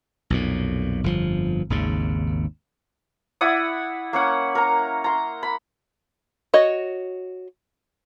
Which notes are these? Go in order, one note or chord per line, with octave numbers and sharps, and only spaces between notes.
B1 F2 A#2
G1 F2 C#3 F3
G#1 D#2 C#3
E4 D5 F#5 D#6
A#3 C#4 F#5
A#4 A#5
A#5 C6
B5
F#4 C#5 D#5